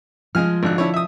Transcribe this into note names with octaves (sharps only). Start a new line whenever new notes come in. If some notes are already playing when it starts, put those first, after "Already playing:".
F3 G#3 F4 G#5 F6
G#1 D3 F#6
D3 E4 C#5
E5 D#6